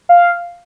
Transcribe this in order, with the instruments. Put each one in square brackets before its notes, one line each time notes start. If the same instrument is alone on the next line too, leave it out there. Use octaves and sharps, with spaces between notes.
[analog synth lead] F5